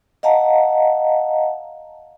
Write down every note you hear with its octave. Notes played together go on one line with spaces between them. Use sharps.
D#5 F5 F#5 A5 A#5